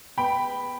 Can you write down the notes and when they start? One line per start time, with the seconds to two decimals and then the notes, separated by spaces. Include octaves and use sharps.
0.17 B3 G5 B5